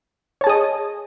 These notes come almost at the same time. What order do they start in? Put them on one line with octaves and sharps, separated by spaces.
C#5 A5 G#4 D#5